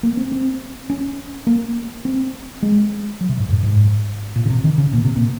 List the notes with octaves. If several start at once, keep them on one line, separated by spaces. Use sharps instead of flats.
A#3
C4
C4
C#4
A#3
C4
G#3
F#3
C3
G#2
F#2
G#2
A#2
C#3
C3
D#3
C#3
A#2
C3
A#2